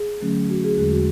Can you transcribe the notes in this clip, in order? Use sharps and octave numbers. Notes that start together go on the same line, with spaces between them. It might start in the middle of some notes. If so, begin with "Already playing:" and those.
Already playing: G#4
D3 F#3 A3 C#4
F#4
G#4
E2 D3 G#3 G#4
F#4